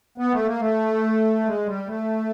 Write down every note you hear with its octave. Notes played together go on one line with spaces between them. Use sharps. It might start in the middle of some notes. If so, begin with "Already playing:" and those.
B3
A3
A#3
A3
G#3
G3
A3